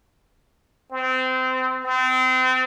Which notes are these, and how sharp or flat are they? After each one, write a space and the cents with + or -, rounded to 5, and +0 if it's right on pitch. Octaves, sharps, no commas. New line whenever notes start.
C4 -20
C4 -30